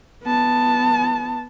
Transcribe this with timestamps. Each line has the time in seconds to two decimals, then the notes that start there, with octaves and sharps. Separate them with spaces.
0.24 B3 A5